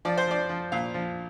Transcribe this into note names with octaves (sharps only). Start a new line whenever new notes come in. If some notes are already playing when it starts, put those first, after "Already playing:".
F3 D5
C5
F3 D5
F3
A#2 F5
F3